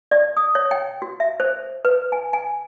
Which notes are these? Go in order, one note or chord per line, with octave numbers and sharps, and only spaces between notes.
D5
D#6
C#5
G5
F#4
E5
C5
B4
G#5
G#5